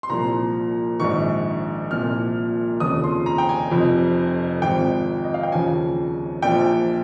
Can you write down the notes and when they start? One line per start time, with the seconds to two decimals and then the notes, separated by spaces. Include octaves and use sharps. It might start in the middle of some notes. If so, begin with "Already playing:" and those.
0.03 C6
0.09 C2 A#2 F3 A#5
1.00 A#1 G#2 D#3 C#6
1.90 C2 A#2 F3 F6
2.80 F1 D#2 C#3 F3 D#6
3.04 C6
3.26 A#5
3.38 G5
3.49 G#5
3.71 F1 F2 C3 F3
4.62 G#1 G#2 F3 G5
5.24 D#5
5.34 F5
5.43 G5
5.52 D#2 C#3 F3 G#5
6.42 A#1 A#2 F3 G5